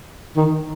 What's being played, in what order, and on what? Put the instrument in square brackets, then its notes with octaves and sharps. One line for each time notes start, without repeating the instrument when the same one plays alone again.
[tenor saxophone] D#3